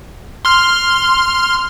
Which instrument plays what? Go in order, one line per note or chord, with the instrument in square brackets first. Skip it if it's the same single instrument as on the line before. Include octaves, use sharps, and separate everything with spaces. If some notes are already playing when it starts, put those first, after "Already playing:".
[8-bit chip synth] C6 F6